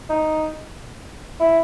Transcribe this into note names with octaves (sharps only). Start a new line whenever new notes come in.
D#4
E4